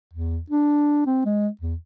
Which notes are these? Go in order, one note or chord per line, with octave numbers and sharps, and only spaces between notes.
E2
D4
C4
G#3
E2